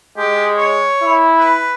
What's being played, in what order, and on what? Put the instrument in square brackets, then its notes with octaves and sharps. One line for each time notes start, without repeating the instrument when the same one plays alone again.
[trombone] G#3 [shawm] G4
[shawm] C#5
[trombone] E4
[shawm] B4